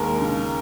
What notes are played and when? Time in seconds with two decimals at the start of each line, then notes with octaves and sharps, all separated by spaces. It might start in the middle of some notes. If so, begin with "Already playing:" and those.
Already playing: D#2 G#3 A#4
0.20 C#3